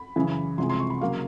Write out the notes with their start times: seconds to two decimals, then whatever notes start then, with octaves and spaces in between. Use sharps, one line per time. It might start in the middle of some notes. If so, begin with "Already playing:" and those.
Already playing: B5
0.16 F#2 C#3 E3
0.58 C2 C3 F3 G#3 C6
0.69 C6
0.80 C#6
0.90 B5
1.01 C#3 F#3 A#3 F5